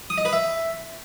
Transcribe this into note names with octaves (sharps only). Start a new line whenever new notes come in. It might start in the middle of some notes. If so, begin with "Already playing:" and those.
D#6
D#5
B4
E5